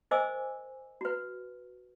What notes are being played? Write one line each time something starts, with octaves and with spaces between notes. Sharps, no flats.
A#4 C5 D#5 G#5 D6 E6
F#4 B4